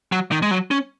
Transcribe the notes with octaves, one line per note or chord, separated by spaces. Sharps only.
F#3
D#3
G#3
F#3
C#4